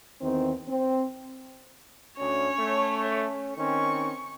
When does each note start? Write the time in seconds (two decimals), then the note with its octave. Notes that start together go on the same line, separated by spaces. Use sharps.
0.21 E2 D#3 C4
0.68 C4
2.19 D2 C#4 C#5
2.57 A3
3.58 D#3 C4 C#4 C#6